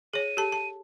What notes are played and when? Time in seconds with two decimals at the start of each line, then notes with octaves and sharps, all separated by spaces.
0.13 G#4 C#5 D#7
0.37 G4 A4 A5
0.52 A5